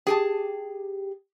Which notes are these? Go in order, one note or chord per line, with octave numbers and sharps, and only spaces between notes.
G4 G#4 G5 A5